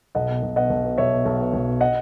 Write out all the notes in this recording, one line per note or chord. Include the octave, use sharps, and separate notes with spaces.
B1 D#5 F#5
B2
B1
B2 D#5 F#5
B1
B2
B1 C#5 E5
B2
B1
B2
B1
B2
D#5 F#5